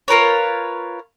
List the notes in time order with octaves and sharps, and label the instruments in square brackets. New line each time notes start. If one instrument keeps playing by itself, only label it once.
[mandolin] F4 A#4 B4 C#5